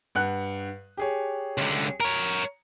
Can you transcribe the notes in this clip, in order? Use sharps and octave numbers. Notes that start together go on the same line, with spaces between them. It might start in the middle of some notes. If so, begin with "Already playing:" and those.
G2 F#5 F#6
G4 G#4 C#5
C#2 D3
A#4 C#5 A#5